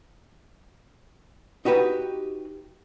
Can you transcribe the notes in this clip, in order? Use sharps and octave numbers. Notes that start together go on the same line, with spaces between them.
D#4 F#4 G4 B4